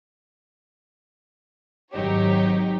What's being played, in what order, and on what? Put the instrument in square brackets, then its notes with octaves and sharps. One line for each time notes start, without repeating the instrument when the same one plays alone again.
[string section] G#1 F#3 D#4 G4 C#5